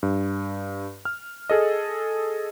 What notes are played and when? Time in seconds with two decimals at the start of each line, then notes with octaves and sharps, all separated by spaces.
0.03 G2
1.05 F6
1.50 G#4 A4 D#5